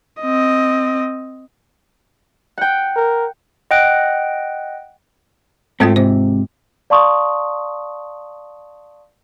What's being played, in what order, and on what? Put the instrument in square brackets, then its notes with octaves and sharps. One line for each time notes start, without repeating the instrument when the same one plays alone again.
[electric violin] C4 D#5
[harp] F#5 G5
[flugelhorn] A#4
[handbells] D#5 F#5 G5 F#6 D7
[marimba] G#2 G#3 F4 [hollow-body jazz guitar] A3 C4
[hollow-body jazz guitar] G#2 C3 [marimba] C5
[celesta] D5 F5 A5 C6 C#6 D#6